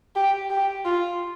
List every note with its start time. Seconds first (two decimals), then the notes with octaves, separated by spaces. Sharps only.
0.16 G4
0.50 G4
0.85 F4